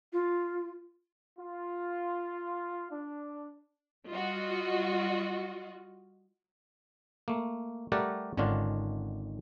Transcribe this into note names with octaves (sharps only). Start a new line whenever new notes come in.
F4
F4
D4
G3 F4 F#4 D#5
A3 A#3
G3 A3 G4 A#4 D5 F#5
G#1 D3 D#3 C#4 D4 F4